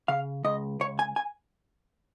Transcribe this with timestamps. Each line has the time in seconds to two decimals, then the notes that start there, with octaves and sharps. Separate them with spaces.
0.08 C#3 F5
0.44 C#2 D#5
0.80 C#2 C#5
0.99 G#5
1.16 G#5